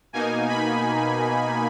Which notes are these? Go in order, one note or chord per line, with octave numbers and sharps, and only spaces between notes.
B2 A#3 D#4 G#5
B5